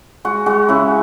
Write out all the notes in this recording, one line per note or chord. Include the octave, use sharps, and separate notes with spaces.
G#3 F#4
G#3 F#4
C#3 E4